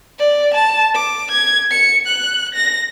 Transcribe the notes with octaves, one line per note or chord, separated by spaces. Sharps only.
D5
A5
D6
G#6
C#7
F#6
A#6